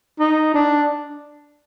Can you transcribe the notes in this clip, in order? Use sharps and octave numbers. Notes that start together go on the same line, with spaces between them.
D#4
D4